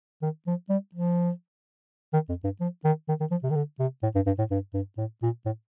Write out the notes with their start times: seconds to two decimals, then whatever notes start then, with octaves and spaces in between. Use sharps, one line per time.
0.22 D#3
0.47 F3
0.70 G3
0.95 F3
2.14 D#3
2.29 F2
2.44 G2
2.61 F3
2.85 D#3
3.09 D#3
3.20 D#3
3.31 F3
3.43 C3
3.50 D#3
3.55 D3
3.79 C3
4.03 A2
4.15 G2
4.27 G2
4.39 A2
4.51 G2
4.74 G2
4.98 A2
5.23 A#2
5.46 A2